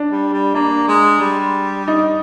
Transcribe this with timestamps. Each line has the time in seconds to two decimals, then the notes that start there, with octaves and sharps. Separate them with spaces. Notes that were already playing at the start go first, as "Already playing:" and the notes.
Already playing: D4
0.10 G3
0.33 G3
0.55 A#3 D4
0.88 G#3
1.21 G3
1.88 D#4